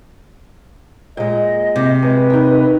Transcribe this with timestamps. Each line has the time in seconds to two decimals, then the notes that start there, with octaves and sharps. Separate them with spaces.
1.17 A#2 G#3 D#5
1.76 C3
2.02 G#3 B4
2.30 D#3 D#4